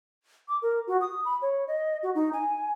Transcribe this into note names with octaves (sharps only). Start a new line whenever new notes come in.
D6
A#4
F#4
D#6
B5
C#5
D#5
F#4
D#4
G#5